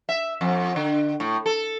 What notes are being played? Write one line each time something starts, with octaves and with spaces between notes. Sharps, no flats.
E5
F2
D3
A2
A4